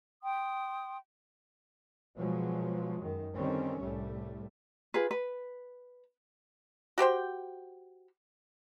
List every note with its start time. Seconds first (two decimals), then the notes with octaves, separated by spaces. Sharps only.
0.22 G5 C6 D#6
2.17 B2 F3 F#3 G#3
3.01 F#2 D#3
3.34 D3 D#3 G3 C4 C#4
3.80 C2 A2 G3 A3
4.94 F4 G#4 B4
5.11 B4
6.98 F#4 G4 C5 G5